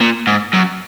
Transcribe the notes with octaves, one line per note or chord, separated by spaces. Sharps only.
A#2
G#2
F#2